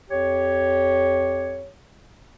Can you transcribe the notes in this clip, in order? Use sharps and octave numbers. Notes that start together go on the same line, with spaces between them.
F2 G4 C#5